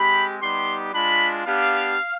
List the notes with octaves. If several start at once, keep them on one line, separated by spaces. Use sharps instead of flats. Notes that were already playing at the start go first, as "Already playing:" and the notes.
Already playing: G#3 C4 G4 B5
G3 B3 D#4 G4 C6
G#3 D4 F4 B5
B3 D4 G4 F5